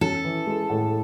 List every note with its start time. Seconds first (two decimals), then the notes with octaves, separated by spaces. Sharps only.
0.01 C#4 A4
0.24 E3
0.47 G#3
0.70 A2